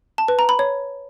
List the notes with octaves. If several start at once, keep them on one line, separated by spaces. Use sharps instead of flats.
A5
B4
A#5
B5
C#5